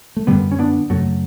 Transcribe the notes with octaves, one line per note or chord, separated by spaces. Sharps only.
A3
F#2 D3 G3 B3
C#4
B3 D4
F#2 C#3 F#3 A3